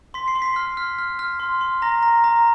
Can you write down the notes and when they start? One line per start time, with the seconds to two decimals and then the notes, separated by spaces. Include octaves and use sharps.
0.14 C6 B6
0.28 C7
0.35 C6
0.42 B6
0.56 F6
0.77 F6
0.98 F6
1.19 F6
1.40 C6
1.61 C6
1.82 A#5 A#6
2.03 A#5
2.24 A#5